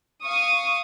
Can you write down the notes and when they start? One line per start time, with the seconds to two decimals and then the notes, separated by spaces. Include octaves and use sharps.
0.23 F5 C#6 D#6